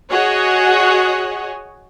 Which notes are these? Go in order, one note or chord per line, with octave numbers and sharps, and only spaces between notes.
F#4 G#4 C#5 D#5 F#5 G#5